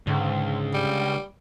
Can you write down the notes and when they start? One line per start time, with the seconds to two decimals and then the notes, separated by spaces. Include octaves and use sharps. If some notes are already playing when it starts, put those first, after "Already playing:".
0.07 C#2 G#2 D3
0.74 G3